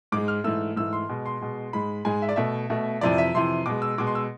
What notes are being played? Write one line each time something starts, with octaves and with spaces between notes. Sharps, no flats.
G#2 G#3 D6
F6
G#2 E3 A3 E6
G#2 E3 A3 E6
C6
B2 G#3
C6
B2 G#3
G#2 G#3 B5
G#2 G#3 G#5
E5
D5
B2 A3 E5
B2 A3
F2 C3 E3 D5
E5
F2 C3 E3 C6
B2 G#3 D6
E6
B2 G#3 D6
C6
E6